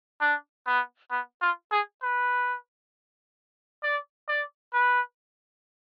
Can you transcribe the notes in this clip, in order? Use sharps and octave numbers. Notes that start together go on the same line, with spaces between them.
D4
B3
B3
F4
G#4
B4
D5
D5
B4